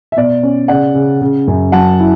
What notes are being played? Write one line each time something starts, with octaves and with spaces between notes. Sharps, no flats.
E5
B2 D5
C#4
C#3 D5 F#5
C#3
C#3
F#2
F#3 F#5 A5
E4